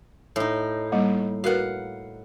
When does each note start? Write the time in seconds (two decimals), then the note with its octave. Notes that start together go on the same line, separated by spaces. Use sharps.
0.36 A2 D#4
0.92 G3 A#3
1.44 F#4 A#4 B4 F5 F#5